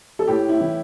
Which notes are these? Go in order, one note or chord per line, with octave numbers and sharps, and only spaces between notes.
A4
A2 G4
E4
E3